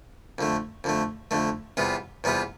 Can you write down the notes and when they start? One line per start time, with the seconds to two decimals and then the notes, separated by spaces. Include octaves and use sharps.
0.38 F2 D3 A3
0.84 F2 D3 A3
1.31 F2 D3 A3
1.77 E2 C3 G3 B3 F4
2.24 E2 C3 G3 B3 F4